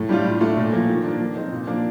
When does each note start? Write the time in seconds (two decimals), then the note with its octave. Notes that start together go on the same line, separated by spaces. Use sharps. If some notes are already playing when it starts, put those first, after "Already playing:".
Already playing: A2
0.09 G3 D4 F4
0.24 A2
0.40 A3 D4 F4
0.56 A#2
0.72 F3 A#3
0.89 D#3
1.04 A#3 D4
1.21 F3
1.35 C4 D#4
1.52 A#2
1.67 F3 A#3 D4